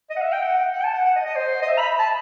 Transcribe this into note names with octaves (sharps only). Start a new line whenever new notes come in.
D#5
F#5
E5
G5
F#5
F#5
G5
A5
F#5
F#5
D#5
D#5
C5
D#5
E5
B5
A5